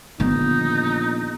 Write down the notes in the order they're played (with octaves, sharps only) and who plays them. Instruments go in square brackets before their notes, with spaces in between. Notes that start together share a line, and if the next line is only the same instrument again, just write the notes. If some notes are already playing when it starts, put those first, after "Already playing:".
[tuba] A#1 [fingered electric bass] D3 D#3 G3 [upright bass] B3 [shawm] D#4